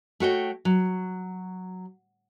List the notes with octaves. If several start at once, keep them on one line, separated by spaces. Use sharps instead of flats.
A3 F#4 C#5 G5
F#3